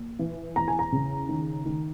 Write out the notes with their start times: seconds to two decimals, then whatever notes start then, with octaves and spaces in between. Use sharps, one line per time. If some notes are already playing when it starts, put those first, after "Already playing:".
Already playing: A#2
0.19 E3
0.56 E2 A#5
0.68 G#5
0.79 A#5
0.92 C#3
1.29 D#3
1.66 D#3